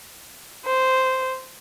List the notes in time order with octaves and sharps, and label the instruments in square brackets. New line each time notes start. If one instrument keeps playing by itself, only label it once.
[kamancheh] C5